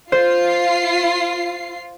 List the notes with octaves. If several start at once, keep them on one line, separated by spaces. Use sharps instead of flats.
F4 C5 C7